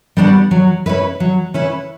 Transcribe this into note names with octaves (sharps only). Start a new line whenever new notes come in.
G3 B3 D4 F#4
F#3
C#4 E4 B4
F#3
C#4 E4 B4